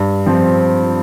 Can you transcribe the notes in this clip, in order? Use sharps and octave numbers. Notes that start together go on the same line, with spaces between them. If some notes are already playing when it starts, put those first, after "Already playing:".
Already playing: G2
F3 C4